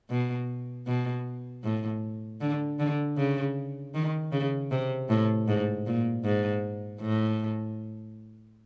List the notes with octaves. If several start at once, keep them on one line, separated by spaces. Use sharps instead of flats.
B2
B2
A2
D3
D3
C#3
D#3
C#3
C3
A2
G#2
A#2
G#2
A2